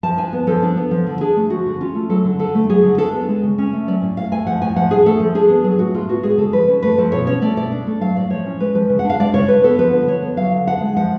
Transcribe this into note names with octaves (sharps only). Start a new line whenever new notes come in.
F3 A5
D4 G#5
B3
F3 A4
D4
B3
F3
D3
D4 G#4
A3
F3 F#4
D3
C#4 F4
A3
F#3 A4
D3
D3 A4
A3
F#3 G#4
D3
D4 A4
B3
G#3
C#3
C#4
A3
F#3 D5
A2
A2 F5
A3 G#5
F3 F#5
A2 G#5
F3 F#5
D4 G#4
A3 A4
F3
D4 G#4
B3
F#3 G#4
A2 F#4
D4 F4
B3 F#4
G#3 G#4
C#3 A4
F3 B4
C#4
A3 B4
F3 A4
B2 C#5
C#4 C#5
A3 D5
B2 D5
D4
A3
F#3 F5
A2 D5
F3 C#5
C#4
G#3 B4
F3 B4
C#3
F#5
D4 F5
G#3 D5
C#3 C#5
D4 B4
B3 A4
F3 B4
D3
D3 C#5
B3
F#3 F5
D3
D4 F#5
G#3
F3 F#5